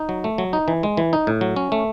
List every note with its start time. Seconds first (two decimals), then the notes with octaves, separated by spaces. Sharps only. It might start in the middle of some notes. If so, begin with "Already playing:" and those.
Already playing: D#4
0.09 F#3
0.24 A3
0.38 F#3
0.53 D#4
0.68 E3
0.83 G#3
0.97 E3
1.13 D#4
1.27 A2
1.41 F#3
1.56 C#4
1.72 A3